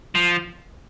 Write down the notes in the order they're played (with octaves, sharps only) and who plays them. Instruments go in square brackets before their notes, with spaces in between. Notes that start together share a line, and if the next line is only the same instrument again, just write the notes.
[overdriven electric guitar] F3